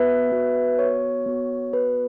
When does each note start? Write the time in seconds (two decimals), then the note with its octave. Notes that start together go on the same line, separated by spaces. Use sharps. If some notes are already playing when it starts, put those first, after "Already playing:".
Already playing: B3 F#4 B4 E5
0.32 B3 F#4
0.79 C#5
1.26 B3 F#4
1.73 B4